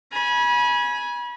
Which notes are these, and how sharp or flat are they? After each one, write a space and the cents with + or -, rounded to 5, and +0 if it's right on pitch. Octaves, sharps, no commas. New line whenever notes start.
G#5 +5 B5 -30